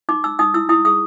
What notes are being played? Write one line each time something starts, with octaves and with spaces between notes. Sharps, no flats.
D#4 D6
D#4 E6
D#4 D#6
E4 E6
E4 D#6
G#4 D#6